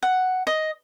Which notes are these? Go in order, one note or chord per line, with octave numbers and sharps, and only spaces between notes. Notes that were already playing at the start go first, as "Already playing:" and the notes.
F#5
D#5